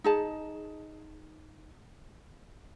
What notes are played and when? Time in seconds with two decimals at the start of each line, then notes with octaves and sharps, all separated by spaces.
0.04 D#4 G#4 A5